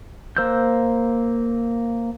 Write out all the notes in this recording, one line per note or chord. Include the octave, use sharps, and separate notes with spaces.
A#3 C5 E6 F#6 G6